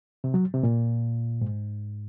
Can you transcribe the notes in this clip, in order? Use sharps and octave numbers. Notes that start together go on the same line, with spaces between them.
C3
F#3
C3
A#2
G#2